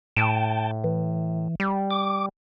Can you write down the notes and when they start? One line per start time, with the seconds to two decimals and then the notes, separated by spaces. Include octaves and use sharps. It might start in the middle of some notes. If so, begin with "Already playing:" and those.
0.17 A2 G5 A5
0.84 E3
1.60 G3
1.91 D6